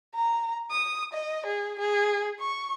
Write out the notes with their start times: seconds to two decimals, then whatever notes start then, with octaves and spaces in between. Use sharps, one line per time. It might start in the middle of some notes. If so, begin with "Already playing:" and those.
0.15 A#5
0.71 D#6
1.14 D#5
1.46 G#4
1.80 G#4
2.40 C#6